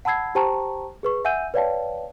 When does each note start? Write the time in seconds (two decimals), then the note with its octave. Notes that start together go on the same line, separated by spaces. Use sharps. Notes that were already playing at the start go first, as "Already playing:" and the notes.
0.05 F#5 A5 B5 E6 G#6 C7
0.35 G4 C5 G5 A5 A#5 C#6
1.03 G#4 B4 C#6
1.25 E5 F#5 G#5 E6 G6 D#7
1.54 B4 C#5 D5 F5 G5 A5